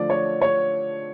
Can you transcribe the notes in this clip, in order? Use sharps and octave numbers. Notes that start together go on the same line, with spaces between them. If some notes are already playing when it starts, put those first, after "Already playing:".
Already playing: D3 F3 A3 D5
C#5
C#5